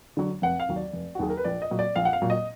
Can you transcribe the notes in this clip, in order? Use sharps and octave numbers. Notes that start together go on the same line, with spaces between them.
D3 F#3
F1 F#5
F5
D#2 D#3 F#3
D5
F1
F#4
D#2 D#3 F#3 G#4
A#4
B4
A#1 D5
D#5
A#2 F#3
D5
A#1 F5
F#5
F5
A#2 F#3
D#5